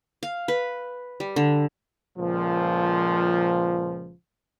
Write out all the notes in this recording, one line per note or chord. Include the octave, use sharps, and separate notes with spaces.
F5
B4
G3
D3
C#2 A#2 F3